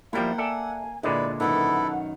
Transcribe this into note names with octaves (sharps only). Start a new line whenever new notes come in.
F3 G3 A#3 E4 E5 F#5 G5
A4 D5 E5 G#5
A#2 D3 G#3 E4 B4 D5
F#2 B2 D#3 E4 A4 B4 F#5